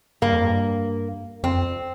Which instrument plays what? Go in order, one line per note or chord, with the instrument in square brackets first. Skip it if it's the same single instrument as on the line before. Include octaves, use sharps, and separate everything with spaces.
[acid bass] G2 [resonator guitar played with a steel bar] A#3
[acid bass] F2
G2
[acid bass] F2 [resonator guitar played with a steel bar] C4